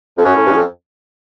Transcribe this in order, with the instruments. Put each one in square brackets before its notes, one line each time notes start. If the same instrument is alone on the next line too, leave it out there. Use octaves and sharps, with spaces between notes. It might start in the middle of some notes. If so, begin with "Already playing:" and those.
[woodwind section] F2
[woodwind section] F#2 [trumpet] C#4
[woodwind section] A2
G2
E2
F2